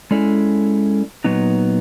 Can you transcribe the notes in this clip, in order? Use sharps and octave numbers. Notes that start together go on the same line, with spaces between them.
G#3 C#4 E4 A4 D5
A#2 F#3 B3 D#4